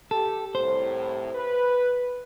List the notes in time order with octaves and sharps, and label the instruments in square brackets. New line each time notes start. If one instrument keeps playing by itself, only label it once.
[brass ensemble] G4 [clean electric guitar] A4
[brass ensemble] C2 A2 [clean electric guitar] C5
[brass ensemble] B4